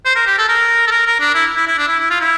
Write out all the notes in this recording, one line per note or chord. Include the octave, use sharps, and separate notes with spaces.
C5
A#4
G4
A4
A#4
A4
A#4
A#4
D4
E4
E4
E4
D4
E4
E4
F4
E4